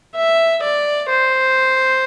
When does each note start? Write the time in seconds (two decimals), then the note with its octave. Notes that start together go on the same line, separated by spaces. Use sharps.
0.16 E5
0.63 D5
1.10 C5